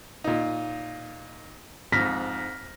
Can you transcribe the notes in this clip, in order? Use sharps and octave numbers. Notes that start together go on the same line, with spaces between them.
A#2 D#4
F2 G#2 F6 A#6 B6